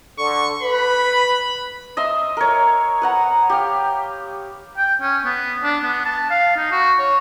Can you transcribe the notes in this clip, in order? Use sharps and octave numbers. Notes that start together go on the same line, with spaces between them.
D3 C#6
B4 B5
D#5 E5 C6
A#4 C#5
B4 F#5 A#5
G4 F5
G5
C#4
B3
D4
B3
A5
F5
D#4
F#4
C#5